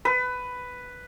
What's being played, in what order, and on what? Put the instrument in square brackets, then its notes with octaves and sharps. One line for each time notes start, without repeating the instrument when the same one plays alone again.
[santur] B4